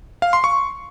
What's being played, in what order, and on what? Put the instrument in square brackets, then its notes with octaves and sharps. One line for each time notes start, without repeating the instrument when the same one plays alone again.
[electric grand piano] F5
C6
C#6